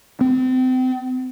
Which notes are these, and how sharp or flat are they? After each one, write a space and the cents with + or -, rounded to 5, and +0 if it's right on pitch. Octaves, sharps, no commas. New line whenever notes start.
C4 -35